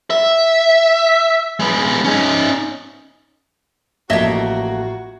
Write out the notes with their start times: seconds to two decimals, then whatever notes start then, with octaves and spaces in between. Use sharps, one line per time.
0.10 E5
1.59 G#3 B3
2.05 C#4 D#4
4.10 A1 F3 A3 A#3 F#4 D#5 E5 G#6